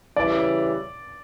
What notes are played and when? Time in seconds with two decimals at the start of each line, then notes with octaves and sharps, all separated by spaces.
0.16 C#3 E3 G3 D5